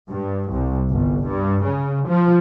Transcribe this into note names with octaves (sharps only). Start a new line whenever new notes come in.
G2
C2
G1
G2
C#3
F3